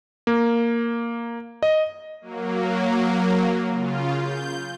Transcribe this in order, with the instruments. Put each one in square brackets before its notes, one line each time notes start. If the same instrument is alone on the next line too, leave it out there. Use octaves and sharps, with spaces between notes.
[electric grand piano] A#3
D#5
[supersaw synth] F#3 A#3
C#3 F4
G6